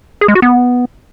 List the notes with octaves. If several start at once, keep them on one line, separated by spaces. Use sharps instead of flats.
G#4
G#3
F#4
B3